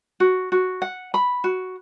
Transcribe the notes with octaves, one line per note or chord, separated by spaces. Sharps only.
F#4
F#4
F#5
B5
F#4